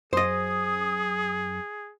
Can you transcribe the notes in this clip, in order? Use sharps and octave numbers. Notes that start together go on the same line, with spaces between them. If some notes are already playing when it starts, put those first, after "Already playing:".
F#2 G#4 C5 D#5 D#6